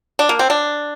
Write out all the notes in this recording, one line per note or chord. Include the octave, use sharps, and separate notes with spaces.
D4
A#3
C4
D4